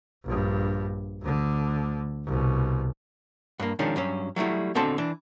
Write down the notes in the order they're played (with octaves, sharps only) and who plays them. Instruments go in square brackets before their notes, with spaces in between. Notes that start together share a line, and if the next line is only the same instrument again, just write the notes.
[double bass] A#1 G2
D2 D3
C2 B2
[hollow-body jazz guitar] G2 A#3
D#3 F3 G#3 C#4 D4
G2 F#3 C#4
F#3 G3 A3 E4
B2 D3 C4 A4 A5
E3 D4